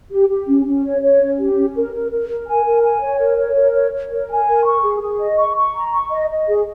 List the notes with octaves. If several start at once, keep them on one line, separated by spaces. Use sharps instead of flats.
G4
G4
C#4
C#4
C#5
C#5
C#4
G4
C#4
A#4
A#4
A#4
A#4
G#5
A#4
G#5
C#5
A#4
C#5
A#4
C#5
C#5
A#4
G#5
A#4
C#6
G#4
G#4
D#5
C#6
C#6
A#5
C#6
D#5
D#5
G#4